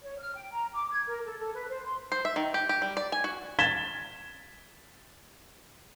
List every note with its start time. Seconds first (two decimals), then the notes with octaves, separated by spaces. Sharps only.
0.03 C#5
0.19 F6
0.35 G5
0.52 A#5
0.74 D6
0.92 G#6
1.07 A#4
1.26 A4
1.39 A4
1.54 B4
1.69 C5
1.85 C6
2.12 C5
2.25 E5
2.36 D#3
2.54 G4
2.69 G4
2.82 G3
2.97 D5
3.12 G#5
3.24 F#4
3.59 G#6 A6 B6 E7 G7